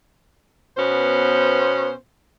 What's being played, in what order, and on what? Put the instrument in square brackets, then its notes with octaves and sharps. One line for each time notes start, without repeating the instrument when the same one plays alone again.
[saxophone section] B2 B3 C#4 C5